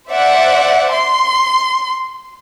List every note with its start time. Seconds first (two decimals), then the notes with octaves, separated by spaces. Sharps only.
0.10 C5 D5 E5 F#5
0.92 C6